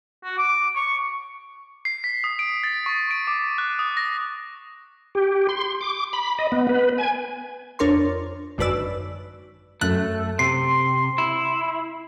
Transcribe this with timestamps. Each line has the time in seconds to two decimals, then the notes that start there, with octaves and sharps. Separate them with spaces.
0.24 F#4
0.38 D6
0.76 C#6
1.85 C7
2.04 B6
2.24 D#6
2.39 D7
2.63 A6
2.86 C#6
3.11 D7
3.27 D6
3.58 F#6
3.79 D#6
3.97 A#6
5.15 G4
5.49 C6
5.81 D6
6.13 B5
6.39 D#5
6.52 B3
6.69 B4
6.98 G#5
7.79 F2 D4 A#4 C#5 C6
8.58 G#1 F#2 D3 B4 D5 E6
9.81 F#2 A3 A4 F#6
10.39 C3 C6 C7
11.18 E4